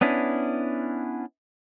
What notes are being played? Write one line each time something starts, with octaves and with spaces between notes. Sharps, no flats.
B3 C#4 D4 E4